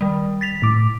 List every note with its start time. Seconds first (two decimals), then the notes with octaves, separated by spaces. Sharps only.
0.01 D#3 G3
0.41 A6 B6 F7
0.62 A2 D6